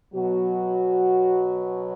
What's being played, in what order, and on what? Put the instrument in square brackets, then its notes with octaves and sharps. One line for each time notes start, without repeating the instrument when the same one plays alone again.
[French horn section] B2 F#3 F#4